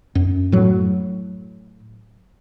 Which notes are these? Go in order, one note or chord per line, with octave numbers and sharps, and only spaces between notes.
F#2
A2 F#3